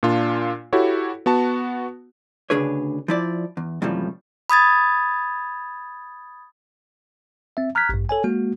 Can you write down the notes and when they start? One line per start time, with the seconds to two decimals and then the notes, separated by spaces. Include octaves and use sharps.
0.03 A#2 D4 F4
0.73 E4 F#4 G4 A4 C#5
1.26 B3 F#4 A5
2.50 D2 C#3 D4 G#4 B4 C#5
3.08 F3 E4 D5
3.57 E2
3.82 F#2 A2 C3 E3 F3 G3
4.50 B5 D#6 G#6 A6
7.57 C4 E5
7.75 A#5 F6 F#6 G#6 B6
7.89 A1 G2
8.09 A4 C#5 G#5
8.24 G#3 A#3 F#4